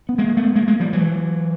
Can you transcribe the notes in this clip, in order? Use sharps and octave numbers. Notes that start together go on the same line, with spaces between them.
B3
G#3 A#3
A3 B3
G#3 A#3
G#3 A#3
F3 G3
E3 F#3